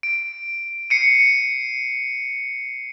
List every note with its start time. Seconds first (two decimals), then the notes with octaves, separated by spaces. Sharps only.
0.03 D7
0.90 C7 C#7 D#7